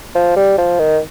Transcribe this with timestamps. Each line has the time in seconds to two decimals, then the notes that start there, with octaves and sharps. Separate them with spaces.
0.15 F3
0.36 G3
0.58 F3
0.79 D#3